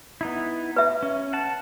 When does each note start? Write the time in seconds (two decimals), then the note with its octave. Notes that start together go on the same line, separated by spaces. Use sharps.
0.21 B3 D#4 E4
0.76 B4 E5
1.03 C#4
1.33 F#5 A5